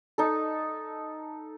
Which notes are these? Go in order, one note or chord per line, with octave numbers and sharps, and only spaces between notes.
D#4 A4